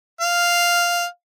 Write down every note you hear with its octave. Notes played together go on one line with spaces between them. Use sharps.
F5